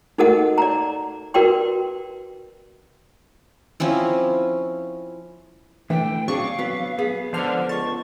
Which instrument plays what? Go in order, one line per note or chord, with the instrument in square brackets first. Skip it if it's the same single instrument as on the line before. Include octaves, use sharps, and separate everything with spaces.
[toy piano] D#4 F#4 A4 A#4 D#5 F#5
D5 A#5
F#4 A#4 B4 D5 G5 C6
[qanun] F3 C4 C#4 E4
[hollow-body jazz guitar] D3 A3 [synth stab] E3 [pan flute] G5
[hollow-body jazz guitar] F#3 D4 G#4 [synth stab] C4 C#6 [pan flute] F5
[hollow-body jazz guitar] F#3 B3
B3 G#4
[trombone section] C#2 D3 [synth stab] F3 C5 F6
[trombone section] C#2 [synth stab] A5 [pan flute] C#6